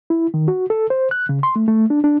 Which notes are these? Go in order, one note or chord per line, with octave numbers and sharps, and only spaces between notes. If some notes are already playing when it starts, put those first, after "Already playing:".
E4
D#3
F#4
A4
C5
F#6
C#3
C6
A3
A3
D4
D4